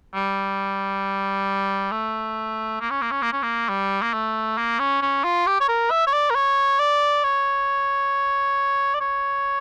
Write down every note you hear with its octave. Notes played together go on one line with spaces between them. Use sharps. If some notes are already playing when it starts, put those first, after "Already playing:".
G3
A3
A#3
C#4
A#3
C#4
A#3
C#4
A#3
G3
A#3
A3
A#3
C#4
C#4
F4
G4
C#5
A#4
E5
C#5
D5
A#4
C#5
D5
C#5
D5
C#5